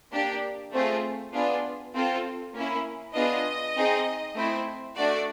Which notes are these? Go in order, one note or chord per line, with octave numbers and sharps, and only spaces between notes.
A#3 D4 G4
A3 C4 F4 G#4
B3 D4 F4 G#4
C4 F4 A4
A#3 C#4 E4
B3 D4 F4 G#4 D#5
C4 D#4 G#4
A3 C4 E4
A3 D4 F#4 D5